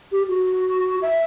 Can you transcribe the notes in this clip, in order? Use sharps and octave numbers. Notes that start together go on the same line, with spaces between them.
G4
F#4
E5